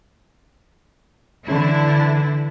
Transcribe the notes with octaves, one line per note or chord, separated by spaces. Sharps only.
D3 E3 D4 E4